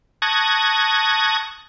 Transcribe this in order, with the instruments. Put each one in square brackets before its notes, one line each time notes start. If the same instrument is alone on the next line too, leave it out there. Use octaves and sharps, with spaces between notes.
[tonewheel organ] A5 C#6 D#6 F#6 G#6 A#6